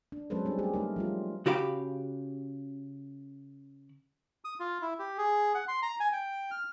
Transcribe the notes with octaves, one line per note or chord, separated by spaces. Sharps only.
D4
F#3 G#3 C#4 A4 B4 C5
G3 C4 D4
A3 G4 G#4
A3 D#4 A#4
F3 G3 F4
C#3 F#4 G4 F5 B5
D#6
F4
E4
G4
G#4
F#5
C6
A#5
G#5
G5
F6